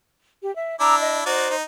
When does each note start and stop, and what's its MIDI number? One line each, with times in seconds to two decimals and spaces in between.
0.43 0.53 67
0.56 0.75 76
0.80 1.24 62
0.80 1.24 64
0.80 0.95 82
0.80 0.95 86
0.80 0.95 88
1.00 1.20 75
1.26 1.49 63
1.26 1.49 66
1.26 1.56 72
1.26 1.49 74
1.50 1.63 63